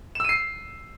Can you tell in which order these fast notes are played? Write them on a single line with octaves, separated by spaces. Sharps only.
E7 E6 D#7 C7